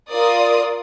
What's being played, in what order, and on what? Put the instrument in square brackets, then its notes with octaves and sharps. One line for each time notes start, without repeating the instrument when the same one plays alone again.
[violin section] F4 A#4 D5 D#6